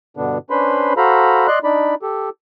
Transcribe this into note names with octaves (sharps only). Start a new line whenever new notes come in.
G2 B2 D3 B3 D4
C#4 D4 B4 C5 B5 C6
F#4 A4 C5 F5 A#5 B5
D5 D#5 C6 F#6
D4 D#4 D5 B5
G4 A4